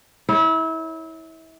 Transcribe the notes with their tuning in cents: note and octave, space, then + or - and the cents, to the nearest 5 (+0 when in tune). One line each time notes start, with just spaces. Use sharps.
E4 -30 C#5 +0